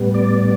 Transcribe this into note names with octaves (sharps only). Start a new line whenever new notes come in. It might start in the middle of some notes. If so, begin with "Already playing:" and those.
Already playing: A2 G3 B3
D5